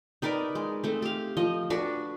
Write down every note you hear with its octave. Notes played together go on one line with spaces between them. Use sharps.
D#4 A#4 B4 D5
G#3
A3 C4
G4 F5
F3 D#5
D4 F#4 B4